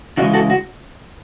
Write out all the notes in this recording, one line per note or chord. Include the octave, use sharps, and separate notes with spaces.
C#3 E3 G#3 F#4
F#4 A4
F#4